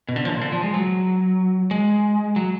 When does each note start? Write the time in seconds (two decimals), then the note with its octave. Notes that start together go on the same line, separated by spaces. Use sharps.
0.09 B2
0.16 D3
0.25 F3
0.32 A#2
0.41 D3
0.52 F3
0.63 G#3
0.74 F#3
1.71 G#3
2.36 F#3